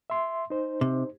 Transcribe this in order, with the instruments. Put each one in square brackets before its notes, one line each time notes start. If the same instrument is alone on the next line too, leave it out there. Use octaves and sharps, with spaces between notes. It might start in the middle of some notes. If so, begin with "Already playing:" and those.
[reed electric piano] E5 C6
D#4 C5
[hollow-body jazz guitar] C3